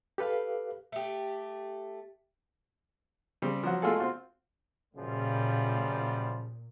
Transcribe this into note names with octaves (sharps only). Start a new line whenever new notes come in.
G4 A4 B4 F5
A3 G4
C#3 G3 C4
F3 F#3 F#4
G#3 A3 F4 F#4 G#4 A4
C4 F4 F#4
F#2 A#2 C#3 F3 G3